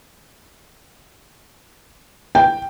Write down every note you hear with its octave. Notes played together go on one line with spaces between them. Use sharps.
G5